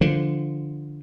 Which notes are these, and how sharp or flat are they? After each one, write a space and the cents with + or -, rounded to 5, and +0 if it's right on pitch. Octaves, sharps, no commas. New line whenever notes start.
D3 +0 F3 -15